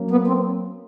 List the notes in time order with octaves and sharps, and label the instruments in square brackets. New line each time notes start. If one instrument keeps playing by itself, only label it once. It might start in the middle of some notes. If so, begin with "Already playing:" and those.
Already playing: [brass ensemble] F#3 A#3 C#4
[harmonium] B3
C4